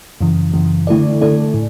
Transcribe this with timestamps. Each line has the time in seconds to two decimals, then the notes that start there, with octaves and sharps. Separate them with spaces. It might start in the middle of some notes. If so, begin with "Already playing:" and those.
0.21 F#2 C#3 E3
0.54 F#2 C#3 E3
0.87 D3 A3 E4 A4 D5
1.21 D3 A3 E4 A4 D5
1.54 A2